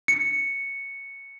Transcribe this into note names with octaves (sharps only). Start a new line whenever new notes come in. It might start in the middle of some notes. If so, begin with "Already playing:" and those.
C#7